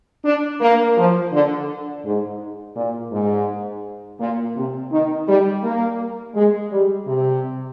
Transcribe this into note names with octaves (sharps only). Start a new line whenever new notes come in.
D4
A#3
F3
D3
G#2
A#2
G#2
A#2
C3
D#3
G3
A#3
G#3
G3
C3